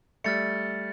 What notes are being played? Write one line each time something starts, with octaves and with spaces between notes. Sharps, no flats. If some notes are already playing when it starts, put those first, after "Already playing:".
G3 A3 F6 A6 C#7